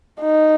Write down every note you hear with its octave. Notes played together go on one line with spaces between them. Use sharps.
D#4